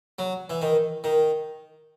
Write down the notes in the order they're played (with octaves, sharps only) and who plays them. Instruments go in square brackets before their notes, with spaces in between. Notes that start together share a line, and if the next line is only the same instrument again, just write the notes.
[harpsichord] F#3
E3
D#3
D#3